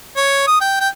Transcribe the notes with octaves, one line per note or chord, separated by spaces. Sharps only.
C#5
D#6
G5
G5